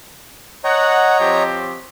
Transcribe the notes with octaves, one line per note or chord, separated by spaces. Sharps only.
C#5 D#5 F#5 A#5
F3 C4 G4